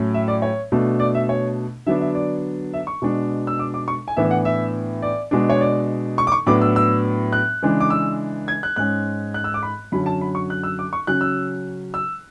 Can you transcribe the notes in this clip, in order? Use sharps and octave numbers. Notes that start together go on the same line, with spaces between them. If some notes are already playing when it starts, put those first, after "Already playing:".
Already playing: A2 F#3 A3 C#4
E5
D5
C#5
B2 A3 D4
D5
E5
C#5
D3 F#3 B3 D4 E5
E5
D5
E5
C#6
B2 G#3 D4
E6
D6
D6
C#6
G#5
A2 E3 B3 D4 E5
F#5
E5
D5
B2 G#3 D4
C#5
D5
C#6
D6
C#6
A2 F#3 B3 D4 D6
E6
E6
F#6
C#3 E3 G#3 D4
D6
E6
G#6
F#6
G#2 G#3 C#4 F#6
F#6
E6
D6
B5
F#2 D3 F#3 C#4 B5
A5
B5
C#6
F#6
E6
D6
C#6
C#3 F#3 C#4 F#6
E6
E6